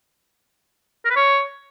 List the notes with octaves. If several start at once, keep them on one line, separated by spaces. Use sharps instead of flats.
A#4
B4
C#5